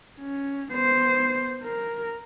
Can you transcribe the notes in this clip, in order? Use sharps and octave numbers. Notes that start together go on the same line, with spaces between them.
C#4
B3 C5
A#4